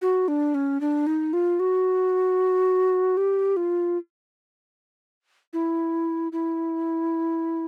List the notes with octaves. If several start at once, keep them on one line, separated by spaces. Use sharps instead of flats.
F#4
D4
C#4
D4
D#4
F4
F#4
G4
F4
E4
E4